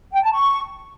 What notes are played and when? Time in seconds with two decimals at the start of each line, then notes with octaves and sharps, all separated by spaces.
0.11 G5
0.22 A5
0.33 C#6